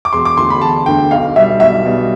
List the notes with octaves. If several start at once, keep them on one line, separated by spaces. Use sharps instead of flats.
D6
E1 C6
D6
D2 D3 C6
B5
E1 A5
D2 D3 G5
B1 F5
B2 G3 E5
B1 E5
B2 G3